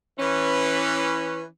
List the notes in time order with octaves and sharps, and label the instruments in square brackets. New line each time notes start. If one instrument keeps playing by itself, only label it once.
[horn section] E3 C#4 B4